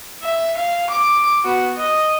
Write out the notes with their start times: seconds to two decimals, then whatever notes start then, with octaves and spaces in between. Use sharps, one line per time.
0.22 E5
0.57 F5
0.90 D6
1.44 B3 F#4
1.76 D#5